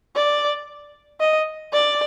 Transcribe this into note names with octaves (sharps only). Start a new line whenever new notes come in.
D5
D#5
D5